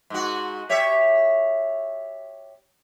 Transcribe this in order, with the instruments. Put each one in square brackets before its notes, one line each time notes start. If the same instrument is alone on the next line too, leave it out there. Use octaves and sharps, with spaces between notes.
[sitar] G#2 F#4
G4 C#5 E5